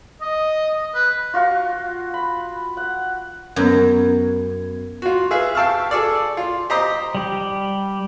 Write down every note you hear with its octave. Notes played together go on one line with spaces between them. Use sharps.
D#5
B4
F4 F#4 F5 C#6
B5
F#5
F#2 B3 G#6
F4 F#4
G#4 B4 E5 F5
F5 G5 A5 C#6 E6 F6
G#4 A4 D5
F4
G4 C5 D#5 A#5 D#6
G3 G4